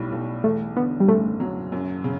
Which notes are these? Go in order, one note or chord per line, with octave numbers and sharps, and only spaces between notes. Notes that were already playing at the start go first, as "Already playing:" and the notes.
Already playing: B1 A2 G3
B1
E2 A3
D3 B3
G3
F#1 A3
F#3
F#2
C#3